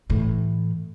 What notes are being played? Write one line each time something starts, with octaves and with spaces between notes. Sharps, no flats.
A2 E3